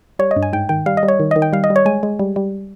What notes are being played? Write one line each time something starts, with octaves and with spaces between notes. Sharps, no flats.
G3 C#5
D#5
G2
G#5
G#2 G5
D#3 G5
G3 F5
D#5
G3
C#5
D#3
D#3 D#5
G5
G3 F5
D#5
G3
C#5
G#3 G#5
G#3
G3
G3